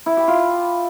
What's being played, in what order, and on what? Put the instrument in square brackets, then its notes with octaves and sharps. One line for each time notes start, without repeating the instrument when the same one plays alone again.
[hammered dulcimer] E4
G4
F4